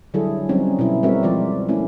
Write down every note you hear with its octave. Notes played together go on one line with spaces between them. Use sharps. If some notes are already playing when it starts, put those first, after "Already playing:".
D3 F#3 G3 E4 G#4 A4
F#3 G3 C4 C#4 D#4
B2 E4
G3 G#3 C4 F#4 A#4 E5
F3 F4 D5
A3 A#3 C#4 E4